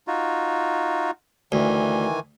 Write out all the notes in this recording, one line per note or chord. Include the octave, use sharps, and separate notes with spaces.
D#4 F4 F#4
D2 D#3 E3 G#5